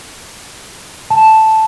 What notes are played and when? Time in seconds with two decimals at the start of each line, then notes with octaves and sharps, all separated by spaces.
1.10 A5